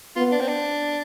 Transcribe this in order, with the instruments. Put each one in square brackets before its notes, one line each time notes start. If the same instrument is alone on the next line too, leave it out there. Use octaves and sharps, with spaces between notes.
[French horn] B3 [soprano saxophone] F4
[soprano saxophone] D4
C4
D4